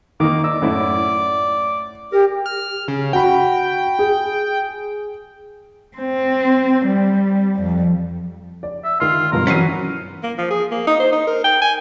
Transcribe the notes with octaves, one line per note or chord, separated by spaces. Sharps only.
D#3 A#3 D6
D5 D#5 E6
F#2 A2 E4
G4 A#4
F6
C#3
F#4 G5 B5
G#4
C4
G3
F2
D5
E5
D#3 F4 C7
G2 B2 F3 A#4
E3 F#3 C#4 B6 C7 D#7
A#3
F3
G#4
A#3
D#4
C5
D#4
A#4
G5
G#5